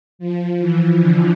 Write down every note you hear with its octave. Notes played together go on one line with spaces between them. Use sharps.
F3
E3
D3